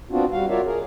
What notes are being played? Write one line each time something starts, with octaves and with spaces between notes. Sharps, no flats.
B3 C4 D4 F4 F#4
G3 F#4 F5
F4 F#4 A#4 C#5 D5 E5
G#4 A#4